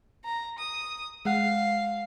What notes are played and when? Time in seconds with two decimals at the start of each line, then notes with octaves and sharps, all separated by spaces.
0.25 A#5
0.58 D#6
1.25 G#3 F5 F#5